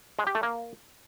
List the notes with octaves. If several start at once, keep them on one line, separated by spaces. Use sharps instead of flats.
G#3
G4
A3
A#3